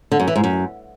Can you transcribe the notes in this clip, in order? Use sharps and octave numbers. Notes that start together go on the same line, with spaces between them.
D3
F#2
E3
G#2
F#2